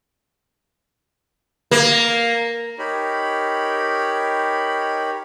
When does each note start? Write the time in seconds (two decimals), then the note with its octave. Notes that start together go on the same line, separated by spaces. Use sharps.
1.71 A#3
2.78 D#4 G4 A#4 C#5 B5